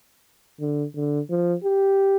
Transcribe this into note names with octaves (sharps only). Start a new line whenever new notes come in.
D3
D3
F3
G4